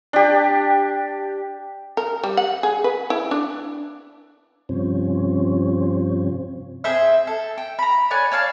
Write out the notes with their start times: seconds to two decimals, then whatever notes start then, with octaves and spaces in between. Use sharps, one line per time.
0.13 D4 G4
1.97 A#4
2.24 G3
2.37 F#5
2.63 G#4
2.84 B4
3.10 E4
3.31 D4
4.69 G2 C3 F3 C4 C#4
6.84 C4 G#4 C5 E5
7.27 A4
7.58 G5
7.79 A#5 B5
8.11 C#5 D5 F#5 G#5
8.32 C#5 D5 F5 A5